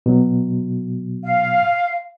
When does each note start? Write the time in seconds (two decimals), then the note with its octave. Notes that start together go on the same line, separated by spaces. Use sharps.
0.06 B2 F#3
1.25 F5